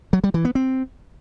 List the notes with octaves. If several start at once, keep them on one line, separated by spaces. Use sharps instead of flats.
F#3
G3
E3
B3
C4